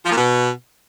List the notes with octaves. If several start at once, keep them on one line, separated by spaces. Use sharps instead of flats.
F3
A#2
B2